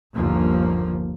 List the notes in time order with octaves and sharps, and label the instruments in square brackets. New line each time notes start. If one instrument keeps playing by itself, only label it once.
[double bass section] G1 D#2 F3 A#3